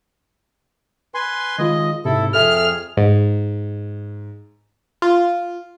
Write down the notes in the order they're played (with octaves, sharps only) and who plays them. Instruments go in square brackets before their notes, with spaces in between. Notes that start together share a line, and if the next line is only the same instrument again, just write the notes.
[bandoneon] B4 G#5 C6
[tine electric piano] D#3 G#3 F4 [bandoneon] D#5
[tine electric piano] G#2 C3 [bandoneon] E4 A4
[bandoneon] F2 G#4 [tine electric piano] A4 E5 [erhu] F6
[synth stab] G#2
F4